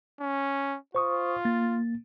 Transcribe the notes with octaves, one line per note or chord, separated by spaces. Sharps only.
C#4
F4 C5 C#6 D#6
A#3 A6